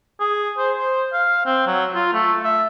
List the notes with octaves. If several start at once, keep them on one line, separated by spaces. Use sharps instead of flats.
G#4
C5
C5
F5
C4
F#3
F4
A3
E5